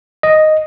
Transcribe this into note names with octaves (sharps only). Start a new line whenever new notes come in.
D#5